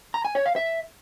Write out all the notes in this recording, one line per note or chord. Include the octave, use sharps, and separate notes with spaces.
A#5
G#5
C#5
F5
E5